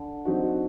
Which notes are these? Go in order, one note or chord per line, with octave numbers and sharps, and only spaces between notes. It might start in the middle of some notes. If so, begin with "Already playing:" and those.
Already playing: D3
F#3 C4 D#4 F#4